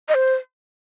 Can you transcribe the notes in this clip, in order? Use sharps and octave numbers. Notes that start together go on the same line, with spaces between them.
D#5
C5